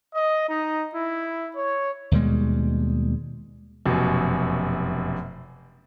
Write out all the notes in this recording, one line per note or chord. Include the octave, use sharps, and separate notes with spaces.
D#5
D#4
E4
C#5
D#2 B2 G3 G#3
F1 F#2 B2